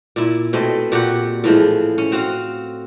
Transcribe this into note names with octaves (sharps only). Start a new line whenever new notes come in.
A#2 E4
B2 A3 C4 D#5
A#2 F#4 G4 F#5
A2 E3 F3 G#3
C#4
C4 F#4 F5